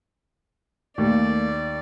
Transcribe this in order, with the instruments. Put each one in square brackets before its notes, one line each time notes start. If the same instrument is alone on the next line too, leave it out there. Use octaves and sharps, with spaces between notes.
[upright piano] D#2 [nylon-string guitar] A3 A#3 [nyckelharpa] D5